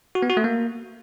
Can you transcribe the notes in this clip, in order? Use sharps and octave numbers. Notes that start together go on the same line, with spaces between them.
F#4
B3
F#4
A3
A#3